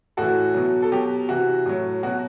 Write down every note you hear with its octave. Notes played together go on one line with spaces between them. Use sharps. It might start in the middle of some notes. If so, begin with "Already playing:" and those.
A2 E3 F#4 A4
B2 F#3
A4
B2 F#3 G4
C3 E3 F#4
A2 F#3
B2 F#3 F#4